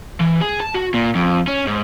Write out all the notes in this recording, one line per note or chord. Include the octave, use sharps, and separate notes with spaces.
E3
G#4
A5
F#4
A#2
F2
C#4
G#2